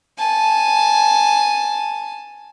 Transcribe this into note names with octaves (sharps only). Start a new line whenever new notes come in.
G#5 A5